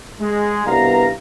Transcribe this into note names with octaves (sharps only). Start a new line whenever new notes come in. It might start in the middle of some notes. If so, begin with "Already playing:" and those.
G#3
C2 G2 B2 B3 F5 A#5